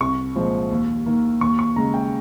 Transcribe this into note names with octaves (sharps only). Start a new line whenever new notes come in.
C2 C#6
A#2 F3 G#3 C4
D#2
D#3 A#3
D#2 C#6
C#6
C#3 G#3 A#5
G5